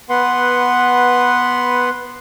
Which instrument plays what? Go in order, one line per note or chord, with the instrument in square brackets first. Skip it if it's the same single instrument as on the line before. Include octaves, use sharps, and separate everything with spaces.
[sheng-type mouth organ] B3 B4 F#5 C6